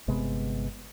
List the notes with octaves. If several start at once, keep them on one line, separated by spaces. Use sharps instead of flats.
G1 C3 G#3 B3